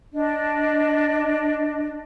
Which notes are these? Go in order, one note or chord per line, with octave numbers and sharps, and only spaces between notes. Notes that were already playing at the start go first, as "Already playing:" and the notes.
D4 D#5